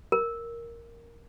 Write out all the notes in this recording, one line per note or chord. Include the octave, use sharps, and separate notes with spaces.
A#4